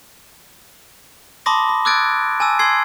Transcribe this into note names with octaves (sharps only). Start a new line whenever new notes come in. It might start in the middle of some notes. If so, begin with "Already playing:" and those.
A5 B5 C6 D6 D#6 A#6
B5
D6 E6 F#6 G#6 A6 D7
G#5 A5 D6 E6
C6 E6 G#6 C7